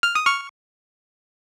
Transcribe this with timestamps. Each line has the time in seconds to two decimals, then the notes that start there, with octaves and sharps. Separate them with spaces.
0.03 F6
0.15 D#6
0.25 C#6 F6